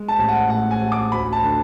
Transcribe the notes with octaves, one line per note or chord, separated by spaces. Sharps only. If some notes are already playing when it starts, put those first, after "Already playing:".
Already playing: G#3
A5
A1
F#5
A2 F#5
G#5
A1
D6
D2 B5
A5
D3